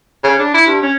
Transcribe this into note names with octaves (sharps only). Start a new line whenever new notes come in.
C#3
D4
E4
G2
C#4